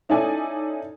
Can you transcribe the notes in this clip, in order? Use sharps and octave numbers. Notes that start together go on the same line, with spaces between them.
C#4 D#4 E4 A4 D5 G#5